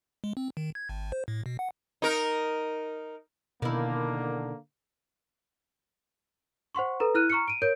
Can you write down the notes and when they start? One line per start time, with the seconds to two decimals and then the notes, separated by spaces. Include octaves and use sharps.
0.24 G#3
0.37 C4
0.57 D#3
0.75 G#6
0.89 G#1
1.12 C5
1.28 A2
1.46 B2
1.59 F#5
2.02 D#4 A#4
3.62 B2 D3 D#3 A#3 E4
6.75 C5 F#5 C6 C#6
7.00 A4 B4 A#5
7.15 E4 F6 F#6 D#7
7.30 A#5 C#6 F6 C#7
7.48 D7 D#7
7.62 A#4 C#5 G6 D7